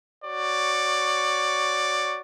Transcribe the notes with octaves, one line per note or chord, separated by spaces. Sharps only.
F#4 C#5 D5